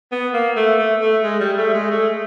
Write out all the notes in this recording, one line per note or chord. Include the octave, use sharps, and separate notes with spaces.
B3
A#3
A3
A3
A3
G#3
G3
A3
G#3
A3